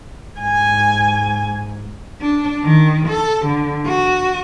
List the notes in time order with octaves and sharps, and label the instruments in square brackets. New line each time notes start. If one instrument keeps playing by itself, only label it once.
[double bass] G#2 [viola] G#5
[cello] D4
D#3
A4
D3
F#4